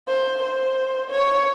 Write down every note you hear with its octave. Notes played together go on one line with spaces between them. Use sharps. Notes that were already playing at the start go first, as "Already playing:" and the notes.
C5
C5
C#5